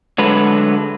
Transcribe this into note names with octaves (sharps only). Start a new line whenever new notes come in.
D3 F#3 G#3 A3 B4